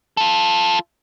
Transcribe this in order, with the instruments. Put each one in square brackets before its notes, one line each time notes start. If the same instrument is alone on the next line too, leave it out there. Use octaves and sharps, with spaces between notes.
[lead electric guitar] F4 A4